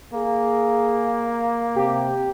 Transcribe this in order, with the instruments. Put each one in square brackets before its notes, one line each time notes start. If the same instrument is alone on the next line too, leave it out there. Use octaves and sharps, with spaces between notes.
[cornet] A#3 [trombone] G#4
[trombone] C3 [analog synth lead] G4